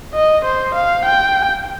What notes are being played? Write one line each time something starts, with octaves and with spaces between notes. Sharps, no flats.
D#5
C5
F5
G5